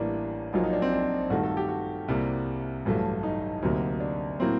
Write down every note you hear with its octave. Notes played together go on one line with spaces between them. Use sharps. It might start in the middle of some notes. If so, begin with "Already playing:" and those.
Already playing: A1 A2 G3 A#3 D4
A#1 A#2 F#3 A#3 D#4
D#4
D4
C4
D4
G2 D#3 A3 F#4
A4
G4
F#4
C2 C3 G3 A#3
A1 G2 F#3 A3
D#4
D2 C3 F#3 A#3
D4
A2 F#3 A#3 C4